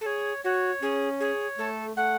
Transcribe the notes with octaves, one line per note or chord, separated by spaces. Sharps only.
A4
G#4 C#5
F#4 C#5
C#4 G#4
G#4 C#5
A3 A4
A3 F#5